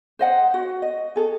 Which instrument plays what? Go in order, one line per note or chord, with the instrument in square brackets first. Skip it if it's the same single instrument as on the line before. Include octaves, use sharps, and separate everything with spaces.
[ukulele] C5 D#5 F#5
F#4
D#5
G#4 A4